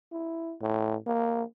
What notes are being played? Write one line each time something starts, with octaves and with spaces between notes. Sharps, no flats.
E4
A2
A#3